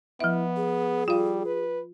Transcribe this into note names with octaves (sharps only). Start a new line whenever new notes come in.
F3 B3 E4 E5
G#4
G3 F4 F5
B4